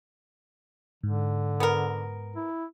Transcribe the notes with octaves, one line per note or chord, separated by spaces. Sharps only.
G#2 D3
B3 A#4
E4